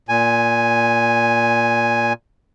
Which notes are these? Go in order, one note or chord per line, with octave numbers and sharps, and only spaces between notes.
A#2 G#5